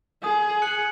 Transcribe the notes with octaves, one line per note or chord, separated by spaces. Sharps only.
G#4 D#6
F#6 C#7 F#7